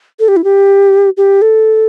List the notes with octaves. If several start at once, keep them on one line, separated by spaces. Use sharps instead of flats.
A4
G4
E4
G4
G4
A4